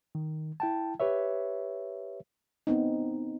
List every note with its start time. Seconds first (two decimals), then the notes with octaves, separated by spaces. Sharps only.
0.15 D#3
0.60 E4 G5 A5
1.00 G4 B4 C#5 E5
2.67 B3 C4 D#4